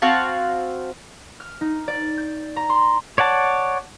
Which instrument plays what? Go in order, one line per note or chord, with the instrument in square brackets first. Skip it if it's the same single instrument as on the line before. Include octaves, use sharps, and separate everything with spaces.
[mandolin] C4 F#4 F5 A5
[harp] F6
D#4
D5
G6
A#5
C6
[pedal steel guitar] C#5 D5 F#5 A5